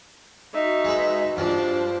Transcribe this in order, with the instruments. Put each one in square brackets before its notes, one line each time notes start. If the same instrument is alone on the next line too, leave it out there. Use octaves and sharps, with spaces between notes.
[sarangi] D#4 [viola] F#4 E5
[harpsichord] G#3 B4
[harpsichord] G2 F3 [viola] G3 C5 [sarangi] D4